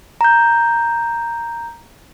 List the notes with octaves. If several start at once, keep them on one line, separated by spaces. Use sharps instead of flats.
A#5 G6